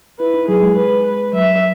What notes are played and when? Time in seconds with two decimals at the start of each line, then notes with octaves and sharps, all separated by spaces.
0.19 E4 B4
0.34 D#4
0.48 F#3 G#4
0.62 G#3
0.76 B4
1.05 B4
1.33 F#3 E5